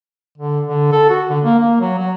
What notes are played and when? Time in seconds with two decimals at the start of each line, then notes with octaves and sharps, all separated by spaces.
0.37 D3
0.68 D3
0.92 A4
1.10 F#4
1.29 D3
1.44 A#3
1.60 A#3
1.81 F#3
1.98 F#3